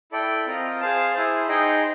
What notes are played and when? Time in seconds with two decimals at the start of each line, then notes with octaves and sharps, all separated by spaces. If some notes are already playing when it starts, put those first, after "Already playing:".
0.12 E4 A4 D5 G5
0.46 C4 F4 A#4 D#5
0.80 G#4 C5 F5 A5
1.14 E4 G#4 C5
1.48 D#4 G#4 C5 D#5 G5